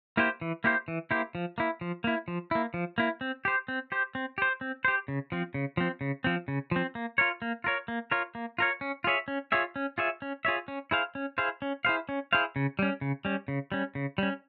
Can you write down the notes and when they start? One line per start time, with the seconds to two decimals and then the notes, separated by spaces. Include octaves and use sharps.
0.17 A#3 E4 G4 C5
0.41 E3
0.64 A#3 E4 G4 C5
0.88 E3
1.11 A#3 E4 G4 C5
1.35 F3
1.58 A#3 E4
1.81 F3
2.04 A#3 E4
2.28 F3
2.51 A#3 E4
2.74 F3
2.98 A#3 E4
3.21 C4
3.45 G4 C5
3.68 C4
3.92 G4 C5
4.15 C4
4.38 G4 C5
4.61 C4
4.85 G4 C5
5.08 C#3
5.32 F3 C4
5.54 C#3
5.77 F3 C4
6.01 C#3
6.24 F3 C4
6.48 C#3
6.71 F3 C4
6.95 A#3
7.18 F4 A#4 C#5
7.42 A#3
7.64 F4 A#4 C#5
7.88 A#3
8.11 F4 A#4 C#5
8.35 A#3
8.58 F4 A#4 C#5
8.81 C#4
9.04 F4 G#4 C#5 E5
9.28 C#4
9.52 F4 G#4 C#5 E5
9.76 C#4
9.98 F4 G#4 C#5 E5
10.22 C#4
10.45 F4 G#4 C#5 E5
10.68 C#4
10.91 E4 G#4 C5 F5
11.15 C#4
11.38 E4 G#4 C5 F5
11.62 C#4
11.85 E4 G#4 C5 F5
12.09 C#4
12.33 E4 G#4 C5 F5
12.56 C#3
12.79 G3 C#4
13.01 C#3
13.25 G3 C#4
13.48 C#3
13.72 G3 C#4
13.95 C#3
14.18 G3 C#4